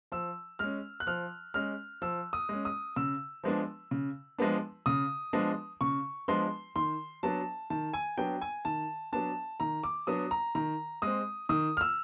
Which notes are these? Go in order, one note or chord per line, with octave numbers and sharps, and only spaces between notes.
F3 E6
G#3 C#4 F6
F#6
F3 F6
G#3 C#4 F6
F3 E6
D#6
G#3 C#4
D#6
C#3 E6
F3 G#3 B3 D4
C#3
F3 G#3 B3 D4
C#3 D#6
F3 G#3 B3 D4
C#3 C#6
F3 G#3 B3 D4 C6
D#3 C6
F#3 B3 D4 A5
D#3 A5
G#5
F#3 B3 D4 G5
G#5
D#3 A5
F#3 B3 D4 A5
D#3 A#5
D6
F#3 B3 D4 D#6
A#5
D#3 A#5
G#3 C4 D#6
D#3 D#6
F6
E6